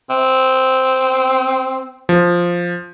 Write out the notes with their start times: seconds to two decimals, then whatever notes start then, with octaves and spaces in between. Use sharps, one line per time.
0.10 C4
2.09 F3